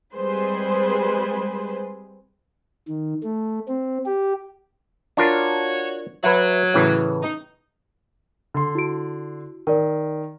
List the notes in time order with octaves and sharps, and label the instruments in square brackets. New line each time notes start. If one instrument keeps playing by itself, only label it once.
[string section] G3 G#3 C4 G#4 B4 C5
[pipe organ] D#3
A3
C4
G4
[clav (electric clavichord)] D4 F4 A#4 [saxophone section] F#4 C#5
[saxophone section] F#3 [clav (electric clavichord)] B4 E5
[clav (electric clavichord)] A2 C#3 E3
[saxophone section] D#4
[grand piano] D3 C6
[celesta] E4 F#4 D7
[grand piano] D#3 [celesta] A#4 D5